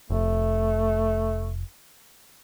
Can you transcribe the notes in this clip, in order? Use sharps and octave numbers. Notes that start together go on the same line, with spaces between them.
F1 A3